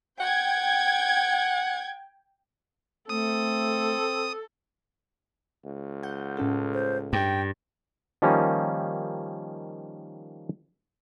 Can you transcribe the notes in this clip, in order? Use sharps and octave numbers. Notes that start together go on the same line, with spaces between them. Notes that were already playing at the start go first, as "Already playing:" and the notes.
F#5 G5 G#6
A3 C4 A4 D#6
C#2
F#5 G6
A2 C#4 A4
C5
G2 G5
D#3 F3 G3 A#3 C#4 D#4